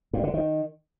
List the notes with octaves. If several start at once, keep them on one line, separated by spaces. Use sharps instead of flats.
G2
D3
D#3